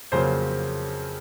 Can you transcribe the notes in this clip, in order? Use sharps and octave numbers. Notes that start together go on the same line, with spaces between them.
F2 C#3 F#3 A#3 C5